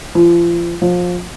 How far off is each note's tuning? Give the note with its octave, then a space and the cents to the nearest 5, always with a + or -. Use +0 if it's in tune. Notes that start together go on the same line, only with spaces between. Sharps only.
F3 -35
F3 +25